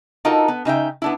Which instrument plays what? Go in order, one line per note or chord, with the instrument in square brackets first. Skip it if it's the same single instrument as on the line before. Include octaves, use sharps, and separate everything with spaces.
[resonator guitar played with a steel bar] D#4 F4 F#4 A4 A#4 D#5
B3
C#3 D#4 E5 G5
B3 D4 E4